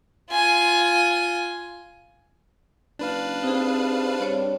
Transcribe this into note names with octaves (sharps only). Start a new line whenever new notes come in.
F4 G#5
F#1 D4 B4 F5
C3 C4 D#4 G#4
G2 C#5 D5